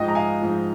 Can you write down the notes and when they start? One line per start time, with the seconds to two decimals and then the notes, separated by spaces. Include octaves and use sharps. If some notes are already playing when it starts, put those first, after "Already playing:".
Already playing: G#2 F3 D#5 G5
0.08 A#5
0.15 F5 G#5
0.41 G#2 F3